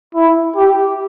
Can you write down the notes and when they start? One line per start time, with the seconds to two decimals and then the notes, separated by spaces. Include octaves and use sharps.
0.15 E4
0.56 G4